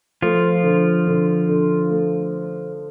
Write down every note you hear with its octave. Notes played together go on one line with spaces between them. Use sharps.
F3 A3 F4
D3
D3
D3
A3